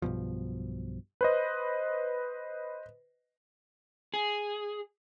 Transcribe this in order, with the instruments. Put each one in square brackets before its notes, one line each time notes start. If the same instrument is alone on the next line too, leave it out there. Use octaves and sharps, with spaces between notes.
[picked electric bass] B1 G2 B2 F3
[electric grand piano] B4 C5 D#5
[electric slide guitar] G#4